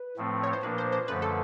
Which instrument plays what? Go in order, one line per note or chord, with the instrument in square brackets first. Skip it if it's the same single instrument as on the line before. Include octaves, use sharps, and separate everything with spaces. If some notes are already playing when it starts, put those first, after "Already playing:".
Already playing: [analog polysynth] B4
[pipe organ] A2 F3 A3 C4
[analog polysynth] C#5
C5
[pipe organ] A#2 F3 A#3 D4 [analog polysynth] B4
[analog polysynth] C5
C5
[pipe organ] F#2 D3 F3 A3 [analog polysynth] B4
[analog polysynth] A4